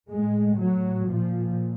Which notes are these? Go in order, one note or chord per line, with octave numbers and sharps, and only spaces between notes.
A2 G#3
F#3
A#2 F3